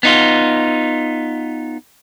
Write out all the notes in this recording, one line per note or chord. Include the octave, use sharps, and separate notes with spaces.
B3 D#4 F4